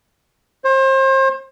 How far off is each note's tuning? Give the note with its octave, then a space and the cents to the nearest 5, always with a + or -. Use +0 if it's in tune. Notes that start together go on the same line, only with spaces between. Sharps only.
C5 +35